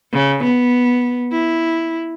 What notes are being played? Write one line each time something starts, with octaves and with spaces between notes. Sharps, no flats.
C#3
B3
E4